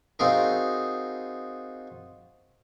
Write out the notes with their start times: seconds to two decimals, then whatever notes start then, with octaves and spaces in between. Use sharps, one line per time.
0.19 C4 D#4 F4 F#4 G#4 A#4